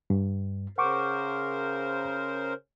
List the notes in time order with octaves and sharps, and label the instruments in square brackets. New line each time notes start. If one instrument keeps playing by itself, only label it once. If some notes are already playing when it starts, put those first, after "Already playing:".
[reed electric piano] G2
[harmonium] C#3 A#4 C5 [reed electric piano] F#5 C#6 D6